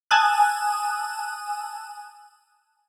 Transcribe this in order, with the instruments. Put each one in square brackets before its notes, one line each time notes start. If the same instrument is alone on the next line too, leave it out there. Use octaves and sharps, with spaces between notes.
[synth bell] G#5 A5 D#6 E6 F#6